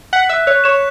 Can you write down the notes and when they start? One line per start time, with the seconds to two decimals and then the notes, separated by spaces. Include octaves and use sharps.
0.13 F#5 B6
0.29 E5 F#6
0.47 C#5 F#6
0.64 C#5 E7